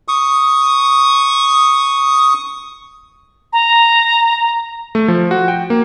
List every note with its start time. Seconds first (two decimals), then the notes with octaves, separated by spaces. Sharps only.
0.08 C#6 D#6
3.53 A#5
4.95 A3
5.08 F3
5.31 F#4
5.48 G5
5.70 A#3